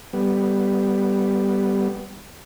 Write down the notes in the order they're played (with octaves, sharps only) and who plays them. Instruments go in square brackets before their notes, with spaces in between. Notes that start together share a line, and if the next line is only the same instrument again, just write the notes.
[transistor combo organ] G3 B3